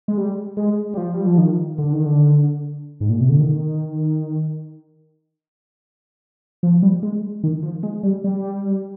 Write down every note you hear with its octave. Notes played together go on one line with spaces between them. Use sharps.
G#3
G3
G#3
G3
F3
G3
F3
D#3
D3
D#3
D3
G#2
A#2
C3
D3
D#3
F3
G3
G#3
D#3
F3
G#3
G3
G3